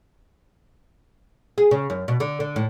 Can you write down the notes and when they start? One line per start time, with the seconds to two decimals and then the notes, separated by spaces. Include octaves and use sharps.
1.58 G#4
1.71 C#3
1.90 F#2
2.08 B2
2.20 D3
2.40 D3
2.56 A2